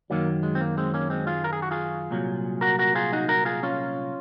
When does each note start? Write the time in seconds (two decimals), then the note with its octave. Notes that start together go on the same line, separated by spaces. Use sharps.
0.10 F#2 D#3 F#3 A#3
0.43 G#3
0.55 C4
0.61 A#3
0.77 G#3 C4
0.94 A#3 C#4
1.10 G#3 C4
1.27 F4 G#4
1.44 A#4
1.53 G#4
1.62 F#4
1.71 F4 G#4
2.11 C2 A#2 F#3
2.61 F#4 A#4
2.79 F#4 A#4
2.95 F4 G#4
3.13 D#4 F#4
3.28 F#4 A#4
3.45 F4 G#4
3.63 C#4 F4